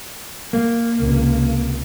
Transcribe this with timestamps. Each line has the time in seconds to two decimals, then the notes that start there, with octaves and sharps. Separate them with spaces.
0.53 A#3
0.96 C#2 C3